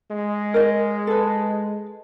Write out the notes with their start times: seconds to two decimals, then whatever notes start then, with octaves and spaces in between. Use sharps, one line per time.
0.11 G#3
0.54 A#4 C#5 D#5
1.07 A4 B4